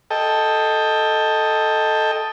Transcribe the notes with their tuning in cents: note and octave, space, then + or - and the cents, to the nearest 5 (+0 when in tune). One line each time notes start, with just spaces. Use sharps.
A4 +0 D#5 +0 G5 +15